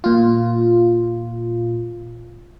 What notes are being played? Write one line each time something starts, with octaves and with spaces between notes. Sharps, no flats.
A#2 F4